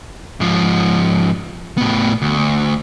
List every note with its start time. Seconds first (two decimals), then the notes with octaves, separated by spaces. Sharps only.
0.40 G#2 F3
1.77 A2 B3
2.22 D2